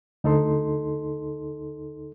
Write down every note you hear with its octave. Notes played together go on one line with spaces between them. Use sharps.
D2 D#4 A4 C6